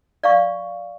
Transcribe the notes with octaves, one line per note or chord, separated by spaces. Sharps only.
D5 F5 C#6